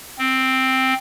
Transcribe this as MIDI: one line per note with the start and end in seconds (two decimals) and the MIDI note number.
0.18 0.94 60